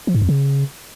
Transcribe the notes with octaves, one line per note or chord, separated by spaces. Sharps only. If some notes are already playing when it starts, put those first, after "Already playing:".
F3
G#2
F2
C#3